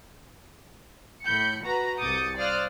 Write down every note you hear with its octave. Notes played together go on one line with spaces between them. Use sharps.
A2 B5 G6 C#7
F#4 B4 A#5
C2 D6 D#6 G6 A6 C#7
C5 D5 F5 D#6 F6 F#6